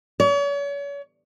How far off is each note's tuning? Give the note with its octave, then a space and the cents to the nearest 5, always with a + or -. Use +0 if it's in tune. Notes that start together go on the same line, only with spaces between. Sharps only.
C#5 +40